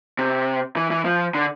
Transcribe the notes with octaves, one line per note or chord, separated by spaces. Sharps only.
C3
E3
E3
F3
D3